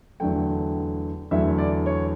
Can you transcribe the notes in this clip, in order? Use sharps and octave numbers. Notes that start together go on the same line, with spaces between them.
E2 D3 F#3 A3 G5
E2 D3 F#3 A3 E5
D5
C#5